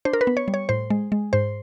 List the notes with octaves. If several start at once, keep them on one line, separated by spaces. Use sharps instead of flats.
D4 C5
A#4
B4
B3
C#5
G3
C#5
A2 C5
G#3
G#3
G#2 C5